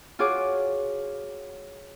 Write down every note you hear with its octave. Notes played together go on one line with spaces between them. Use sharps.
F4 F#4 G#4 C#5 D6